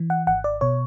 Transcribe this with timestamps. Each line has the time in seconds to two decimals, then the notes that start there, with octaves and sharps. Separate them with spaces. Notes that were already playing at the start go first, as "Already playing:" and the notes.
Already playing: E3
0.10 F#5
0.27 G#1 F#5
0.44 D5
0.61 B2 C#5